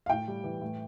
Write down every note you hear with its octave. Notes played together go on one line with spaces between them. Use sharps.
F5
A2 G5
G3
E3
A2